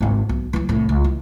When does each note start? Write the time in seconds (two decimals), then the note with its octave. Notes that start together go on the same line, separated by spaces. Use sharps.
0.01 G#1 D#2
0.29 B1
0.53 E3 F#3
0.69 C2 A2
0.89 C#2
1.04 E3